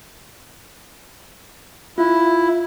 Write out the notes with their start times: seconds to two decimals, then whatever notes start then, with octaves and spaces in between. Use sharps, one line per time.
1.98 E4 F4